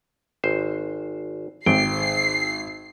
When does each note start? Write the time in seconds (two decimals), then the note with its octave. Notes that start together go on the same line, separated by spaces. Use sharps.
0.44 G#1 C5
1.66 G#1 G5 C7